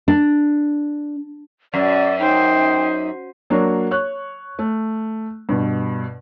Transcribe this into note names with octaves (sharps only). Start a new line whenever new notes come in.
D4
F#2 D5
D#4 C5 G5
F#3 A#3 D4 F#4 C#5
C#5 C#6 F#6
A3
G2 B2